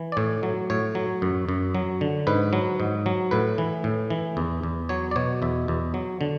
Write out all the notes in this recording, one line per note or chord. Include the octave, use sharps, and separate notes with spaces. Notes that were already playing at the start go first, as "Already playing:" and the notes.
Already playing: E3
D5
A2 C#5
F#3
A2 C#5
F#3
F#2
F#2
F#3
D3
G#2 B4
F#3
G#2
F#3
A2 B4
E3
A2
E3
E2
E2
F#3 C#5
D5
B2 C#5
E2 E5
E2
F#3
D3